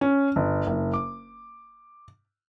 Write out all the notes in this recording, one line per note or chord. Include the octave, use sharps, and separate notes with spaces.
C#4
G1
F#1
D6